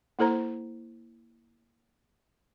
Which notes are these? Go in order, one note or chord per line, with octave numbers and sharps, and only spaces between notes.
A#3 E4 A4 C5 A#5